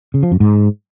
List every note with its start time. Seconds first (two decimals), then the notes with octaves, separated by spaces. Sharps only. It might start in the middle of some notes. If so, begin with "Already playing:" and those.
0.14 C#3
0.23 F3
0.32 F#2
0.40 G#2